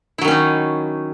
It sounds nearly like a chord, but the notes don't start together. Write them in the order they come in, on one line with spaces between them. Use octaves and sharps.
E4 F#3 D#3 C#4 D#4